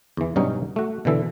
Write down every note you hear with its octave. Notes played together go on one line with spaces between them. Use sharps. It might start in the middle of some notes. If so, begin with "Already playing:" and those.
E2 E3
G2 B2 F#3 G3 C#4 D#4
A3 F#4
B2 D3 E3 A4